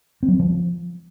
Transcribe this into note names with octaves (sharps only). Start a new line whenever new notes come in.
C4
F#3
C4
F3